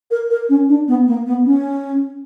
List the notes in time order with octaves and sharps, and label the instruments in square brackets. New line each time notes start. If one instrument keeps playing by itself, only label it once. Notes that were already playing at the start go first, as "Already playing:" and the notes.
[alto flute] A#4
A#4
C#4
D4
B3
A#3
B3
C#4